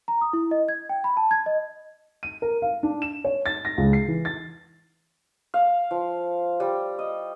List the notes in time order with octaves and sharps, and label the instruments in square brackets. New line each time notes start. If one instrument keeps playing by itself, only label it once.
[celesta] A#5
D#6
E4
D#5
G#6
G5
B5
A5
G#6
D#5
[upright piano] D#7
A#4
F5
D4
E7
C#5
A6
A#6
C#2
C7
E3
A6
[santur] F5
F3
G3
D#5